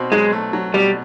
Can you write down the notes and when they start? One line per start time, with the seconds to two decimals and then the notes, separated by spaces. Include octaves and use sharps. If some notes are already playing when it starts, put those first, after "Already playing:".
Already playing: B2 C4
0.12 F#3 G#3
0.32 A3
0.53 F#3
0.74 B2 G3